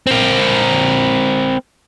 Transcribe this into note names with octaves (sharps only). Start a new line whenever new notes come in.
C4 A#4